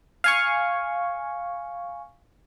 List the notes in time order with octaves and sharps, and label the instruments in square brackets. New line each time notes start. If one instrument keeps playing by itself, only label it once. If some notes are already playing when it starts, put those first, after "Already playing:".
[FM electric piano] F5 G#5 C#6